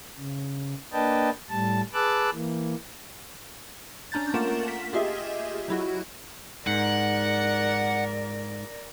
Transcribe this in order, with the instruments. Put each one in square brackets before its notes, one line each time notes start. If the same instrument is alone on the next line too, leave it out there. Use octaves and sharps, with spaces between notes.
[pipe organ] C#3
A#3 D4 B4 D#5 G5 A5
A2 G3 A5
G#4 B4 A5 D6 E6 F#6
E3 A#3
[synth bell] C#4 D4 A#5 G6 A6
A3 A#3 F4 A#4 F#5 E7
B6
F4 G4 G#4 D#5 E5
F#3 E4 F#4
[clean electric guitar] G#2 [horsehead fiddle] A#4 D5 [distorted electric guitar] F#5